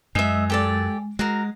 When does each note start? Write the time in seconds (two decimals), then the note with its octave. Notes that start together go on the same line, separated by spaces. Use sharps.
0.15 F#2 G#3 D#5 E5
0.50 G4 A4 D5
1.19 G#3 F#4 A#4